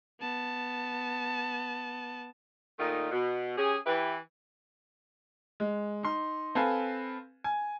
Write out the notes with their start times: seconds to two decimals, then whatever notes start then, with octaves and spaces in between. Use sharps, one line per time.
0.21 B3 A5
2.79 A#2 D#3 A3 D#4 F4
3.11 B2
3.58 C#4 G4 G#4
3.86 E3 E4 G4 B4
5.60 G#3
6.03 D#4 C6
6.55 C4 A4 B4 F5 G#5
7.44 G#5